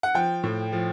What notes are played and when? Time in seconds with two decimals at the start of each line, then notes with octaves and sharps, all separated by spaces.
0.03 F#5
0.14 F3 G5
0.43 A2
0.72 F3